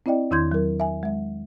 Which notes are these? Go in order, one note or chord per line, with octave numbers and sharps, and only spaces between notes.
C4 E4 D5 D#5 G5
E2 D#3 E4 C6 G6 G#6
F#3 A#4
E5 G#5
G#3 E5